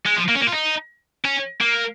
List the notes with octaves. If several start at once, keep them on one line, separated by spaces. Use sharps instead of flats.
G#3
F3
A#3
C#4
A#3
F4
D#4
C#4
A#3